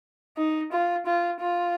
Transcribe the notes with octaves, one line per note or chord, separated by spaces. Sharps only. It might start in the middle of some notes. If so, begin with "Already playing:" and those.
D#4
F4
F4
F4